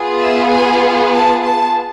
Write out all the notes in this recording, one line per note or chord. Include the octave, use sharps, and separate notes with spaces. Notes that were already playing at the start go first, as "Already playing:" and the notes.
Already playing: B3 F4 G#4
E5
G#5
A5
A5